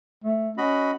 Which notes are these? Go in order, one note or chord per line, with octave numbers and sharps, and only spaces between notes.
A3
C#4 F#4 D#5 B5